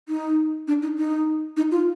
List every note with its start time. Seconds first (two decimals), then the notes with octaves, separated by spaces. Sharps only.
0.09 D#4
0.68 D4
0.82 D#4
0.97 D#4
1.57 D#4
1.71 F4